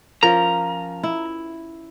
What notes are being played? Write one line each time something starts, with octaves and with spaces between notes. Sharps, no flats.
F3 C#4 A#4 A#5
E4